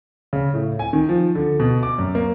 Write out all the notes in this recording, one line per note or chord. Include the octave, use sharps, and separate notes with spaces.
C#3
A2
G#5
D#3
F3
D3
B2
D6
F#2
A#3